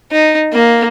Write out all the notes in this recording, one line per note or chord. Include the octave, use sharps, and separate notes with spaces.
D#4
A#3